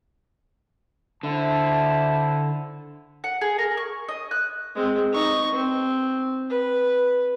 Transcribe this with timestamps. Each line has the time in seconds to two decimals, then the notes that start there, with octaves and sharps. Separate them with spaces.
1.23 D3 E4 C5 A5
3.24 F#5
3.41 G#4
3.58 A#4
3.77 C#6
4.08 D#5
4.31 F#6
4.75 G#3 C4
5.12 D#4 C#6
5.53 C4
6.50 B4